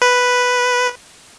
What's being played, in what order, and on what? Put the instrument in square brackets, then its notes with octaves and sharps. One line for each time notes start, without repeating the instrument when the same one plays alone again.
[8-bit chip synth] B4